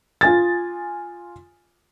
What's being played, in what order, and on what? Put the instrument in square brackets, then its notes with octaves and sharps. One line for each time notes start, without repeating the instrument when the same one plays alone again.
[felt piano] F4 G#5 A6